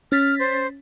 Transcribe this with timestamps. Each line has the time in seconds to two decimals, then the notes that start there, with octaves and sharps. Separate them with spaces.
0.12 C#4 F6 A6 B6
0.39 C5